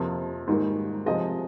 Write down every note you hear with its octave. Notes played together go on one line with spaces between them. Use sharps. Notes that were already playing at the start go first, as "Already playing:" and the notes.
Already playing: F2 C3 F3 A#3
G#2 D#3 G3 A#3
C3 F3 G#3 D#5